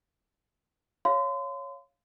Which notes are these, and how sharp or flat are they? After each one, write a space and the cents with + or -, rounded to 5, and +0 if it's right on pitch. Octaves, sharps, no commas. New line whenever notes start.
C#5 +0 F5 -10 C6 -35